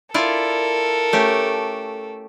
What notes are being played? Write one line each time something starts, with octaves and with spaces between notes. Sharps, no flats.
E4 F4 A4 A#4 D5
A3 C#4 G4